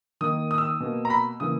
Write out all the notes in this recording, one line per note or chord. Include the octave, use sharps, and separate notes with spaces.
D#3 A#3 D#6
D#6
E6
D#6
B2 A#3
A#5
B5
C#3 E3 A#3 D#6